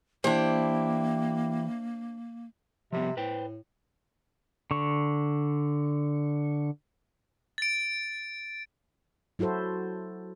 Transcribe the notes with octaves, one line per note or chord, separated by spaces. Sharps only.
E3 A#3 D4 E4 G4 C5
C3 F3 G3 B3
A2 B4 C5 G5
D3 C#6
A6 D7
F#3 E4 F#4 A4 C5